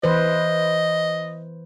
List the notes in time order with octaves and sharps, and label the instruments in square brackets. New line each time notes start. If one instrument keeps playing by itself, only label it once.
[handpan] E3 B4 C5 [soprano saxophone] D#5